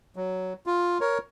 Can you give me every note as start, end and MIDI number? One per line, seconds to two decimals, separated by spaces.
0.16 0.53 54
0.66 0.98 65
1.01 1.18 70
1.01 1.18 73